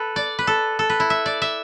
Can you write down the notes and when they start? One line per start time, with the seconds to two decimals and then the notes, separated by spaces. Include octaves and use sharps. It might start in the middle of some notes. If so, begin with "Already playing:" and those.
Already playing: A4 B4
0.16 D5
0.39 B4
0.47 A4
0.79 A4
0.90 B4
1.00 E4
1.10 E5
1.26 D5
1.42 E5